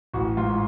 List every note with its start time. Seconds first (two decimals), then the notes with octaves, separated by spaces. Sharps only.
0.14 A1 F#4
0.37 G#2 F4